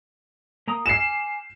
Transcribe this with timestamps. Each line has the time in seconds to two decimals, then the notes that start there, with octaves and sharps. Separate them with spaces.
0.68 A#3 A#5 D#6
0.86 G#5 D6 F6 C7 E7